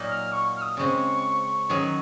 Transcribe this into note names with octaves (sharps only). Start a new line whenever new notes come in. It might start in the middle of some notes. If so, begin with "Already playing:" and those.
Already playing: A#2 F#3 A#3 D#4
F6
C#6
F6
D#6
C#3 G#3 C4 C#6
D#3 F#3 C#4 G#4